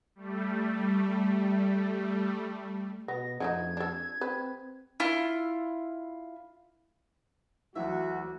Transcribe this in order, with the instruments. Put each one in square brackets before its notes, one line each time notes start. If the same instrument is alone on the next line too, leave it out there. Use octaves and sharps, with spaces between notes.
[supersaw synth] G3 A3
[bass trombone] B2 [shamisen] B3 [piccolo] A#6
[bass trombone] F2 [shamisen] D3 A3 D#4 [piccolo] G#6
[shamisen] D4 A4
[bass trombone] C4 [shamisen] B4
[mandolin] E4 F4
[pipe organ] D2 [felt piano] E3 F#3 [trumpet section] F#4 [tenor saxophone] E5